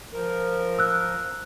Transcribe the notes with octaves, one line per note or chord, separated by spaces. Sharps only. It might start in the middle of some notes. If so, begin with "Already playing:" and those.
F3 A#4
E6 F#6